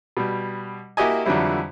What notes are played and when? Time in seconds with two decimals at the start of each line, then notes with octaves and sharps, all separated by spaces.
0.17 B2 G3
0.97 A#3 E4 F#4 G4 D#5 G#5
1.25 F2 D3 E3 F#3 G3 E4